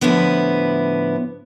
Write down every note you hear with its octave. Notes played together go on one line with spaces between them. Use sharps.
A2 D3 F3 B3 E4